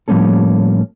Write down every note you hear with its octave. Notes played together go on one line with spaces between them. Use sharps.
A2 F3 G3 A#3 C#4 A4